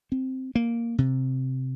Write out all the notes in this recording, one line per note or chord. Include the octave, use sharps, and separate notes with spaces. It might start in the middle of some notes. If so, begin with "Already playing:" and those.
C4
A#3
C3